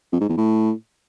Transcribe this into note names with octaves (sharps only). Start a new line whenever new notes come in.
F2
G#2
E2
A2